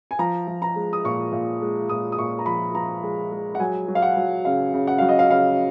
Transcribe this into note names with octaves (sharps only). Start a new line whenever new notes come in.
G#5
F3 A#5
F3
A#5
G#3
D#6
A#2 C#6
A#2
G#3
A#2 D#6
D#6
A#2 C#6
A#5
F3 B5
F3 A#5
G#3
G#3
F#5
F#3 G#5
F#3
F5
F#5
F#3
C#3 F5
C#3
F#5
F#3 F5
D#5
F5
C#3 F5